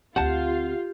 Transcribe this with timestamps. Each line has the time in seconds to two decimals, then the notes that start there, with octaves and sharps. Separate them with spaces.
0.16 D2 C4 F4 G4 F5 F#5 A5